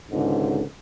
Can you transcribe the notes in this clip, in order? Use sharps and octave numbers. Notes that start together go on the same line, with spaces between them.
G#1 C#2 G#2 D3